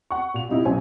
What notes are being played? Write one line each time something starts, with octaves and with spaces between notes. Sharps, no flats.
F#5 C#6
A#2 F7
C3 G3 D#4 E4
B1 F#2 C5 G#5